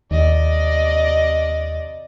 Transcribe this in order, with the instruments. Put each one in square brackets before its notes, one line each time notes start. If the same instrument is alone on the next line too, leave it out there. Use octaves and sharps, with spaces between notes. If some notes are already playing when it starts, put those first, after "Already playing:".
[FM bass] D#2 [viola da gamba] C3 D5 D#5